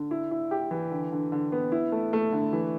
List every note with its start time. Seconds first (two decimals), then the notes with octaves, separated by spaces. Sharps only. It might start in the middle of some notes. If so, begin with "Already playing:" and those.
Already playing: D3
0.11 E4
0.31 E4
0.51 G4
0.71 E3
0.91 D3
1.12 D3
1.32 D3
1.52 B3
1.72 E4
1.92 A3
2.13 A3
2.32 D3
2.53 E3